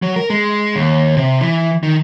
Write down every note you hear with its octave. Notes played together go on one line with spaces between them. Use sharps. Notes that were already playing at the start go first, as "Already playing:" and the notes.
F#3
A#4
G#3
D#2
C3
E3
D#3